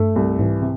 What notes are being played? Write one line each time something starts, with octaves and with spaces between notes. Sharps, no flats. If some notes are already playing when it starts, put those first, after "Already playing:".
Already playing: G2 A3
C2
G#2 E3
C3